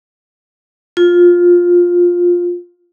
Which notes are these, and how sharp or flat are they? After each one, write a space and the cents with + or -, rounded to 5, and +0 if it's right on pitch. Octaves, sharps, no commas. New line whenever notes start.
F4 +10